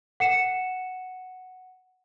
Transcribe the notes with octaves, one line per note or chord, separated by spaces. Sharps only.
F#5 C#7 E7